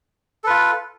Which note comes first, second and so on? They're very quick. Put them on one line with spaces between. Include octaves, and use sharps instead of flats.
A4 B4 F4